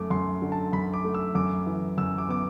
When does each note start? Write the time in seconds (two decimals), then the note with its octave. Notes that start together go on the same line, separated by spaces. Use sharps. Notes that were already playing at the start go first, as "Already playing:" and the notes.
Already playing: F#2 A3 D6
0.10 F#2 C6
0.42 D3
0.52 A5
0.73 F#2 B5
0.94 D6
1.04 A3
1.14 E6
1.35 F#2 D6
1.66 E3
1.98 F#2 E6
2.18 D6
2.29 B3 D6